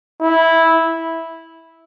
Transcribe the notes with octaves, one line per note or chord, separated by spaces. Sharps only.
E4